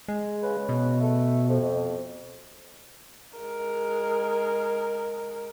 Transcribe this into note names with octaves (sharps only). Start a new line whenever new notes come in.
G#3
C#3 B4
B2
A3
F2
G#3 A#4